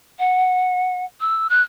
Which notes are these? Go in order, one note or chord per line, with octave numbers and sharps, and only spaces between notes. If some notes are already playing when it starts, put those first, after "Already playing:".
F#5
E6
F#6